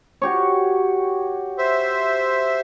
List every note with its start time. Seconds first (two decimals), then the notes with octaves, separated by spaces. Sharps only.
0.22 F#4 G4 C#5
1.58 C5 E5